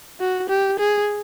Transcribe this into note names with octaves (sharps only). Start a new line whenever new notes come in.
F#4
G4
G#4